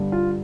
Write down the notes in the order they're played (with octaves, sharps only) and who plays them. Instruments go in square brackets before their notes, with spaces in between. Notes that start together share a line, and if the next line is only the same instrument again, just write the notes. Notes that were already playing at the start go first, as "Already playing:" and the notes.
Already playing: [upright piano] G2 D3 G3
F4